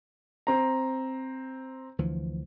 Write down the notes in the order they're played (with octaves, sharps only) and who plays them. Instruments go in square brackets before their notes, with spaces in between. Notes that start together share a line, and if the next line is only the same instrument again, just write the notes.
[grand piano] C4 A#5
[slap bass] D2 E3 F3